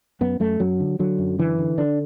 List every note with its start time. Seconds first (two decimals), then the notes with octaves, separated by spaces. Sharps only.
0.21 F#2 B3
0.40 F#2 A3
0.60 F#2 F#3
0.80 D3
0.99 D3 F#3
1.19 F#2
1.39 D3 E3
1.59 D3
1.78 D3 D4